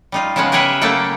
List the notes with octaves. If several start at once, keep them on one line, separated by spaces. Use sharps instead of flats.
G3 D#4 F4
C#3 F3 G#3 B3 C#4
G4 G#4 A#4 B4 C#5 E5
C#3 F#3 A3 A#3 A4 G5